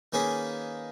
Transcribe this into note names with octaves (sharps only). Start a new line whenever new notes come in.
D#3 A#3 C#4 G#4 B4